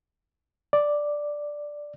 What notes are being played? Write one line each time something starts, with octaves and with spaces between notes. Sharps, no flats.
D5